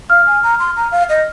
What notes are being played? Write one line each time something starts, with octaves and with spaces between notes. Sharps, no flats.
F5 F6
G#5
A#5
C6
A#5
F5
D#5